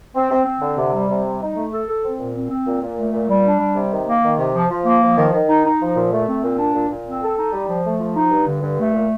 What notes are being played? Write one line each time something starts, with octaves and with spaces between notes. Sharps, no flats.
C4
C4
C4
D3
C3
G3
C3
G3
D#4
A3
A4
A4
C4
A#2
C4
C4
A#2
A#2
A3
A#2
G3
D4
G3
C3
D#3
A#3
D#3
C3
F3
F3
A#3
F3
D#3
D#3
D#4
D#4
F3
A#2
A3
C4
A#2
D4
A#2
A#2
C4
A4
D#4
G3
F3
A3
F3
D#4
G2
D3
G2
A3
A#2